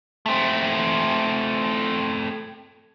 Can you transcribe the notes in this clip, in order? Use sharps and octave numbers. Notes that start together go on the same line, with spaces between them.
A3 C4